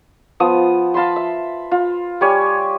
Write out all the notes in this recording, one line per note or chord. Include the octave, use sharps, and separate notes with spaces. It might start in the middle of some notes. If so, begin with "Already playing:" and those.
F3 B3 D#6
F5 A5 B5 C6
E5
F4
G3 G4 C#5 G#5